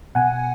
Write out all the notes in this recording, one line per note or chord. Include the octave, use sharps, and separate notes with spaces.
B2 F#5 G#5